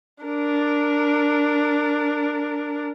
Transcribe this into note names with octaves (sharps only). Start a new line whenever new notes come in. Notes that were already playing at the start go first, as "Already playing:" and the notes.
D4 A#4